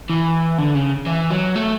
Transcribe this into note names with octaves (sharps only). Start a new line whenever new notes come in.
E3
D3
C#3
E3
F#3
A3